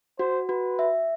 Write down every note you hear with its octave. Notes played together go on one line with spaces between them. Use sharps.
F#4 C5
F#4 B4
E5